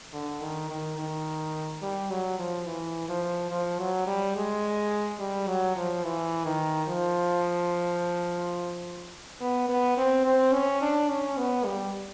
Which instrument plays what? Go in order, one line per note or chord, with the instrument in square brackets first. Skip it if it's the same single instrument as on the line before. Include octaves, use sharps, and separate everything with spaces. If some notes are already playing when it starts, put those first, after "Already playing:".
[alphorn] D3
D#3
D#3
D#3
G3
F#3
F3
E3
F3
F3
F#3
G3
G#3
G3
F#3
F3
E3
D#3
F3
B3
B3
C4
C4
C#4
D4
C#4
B3
G3